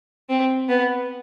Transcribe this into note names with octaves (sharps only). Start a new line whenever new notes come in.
C4
B3